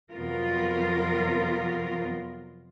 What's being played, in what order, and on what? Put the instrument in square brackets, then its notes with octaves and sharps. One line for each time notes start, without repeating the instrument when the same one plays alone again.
[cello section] F2 C3 F#3 B3 F4 A#4